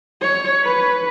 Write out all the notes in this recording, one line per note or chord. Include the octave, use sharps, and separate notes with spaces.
C#5
B4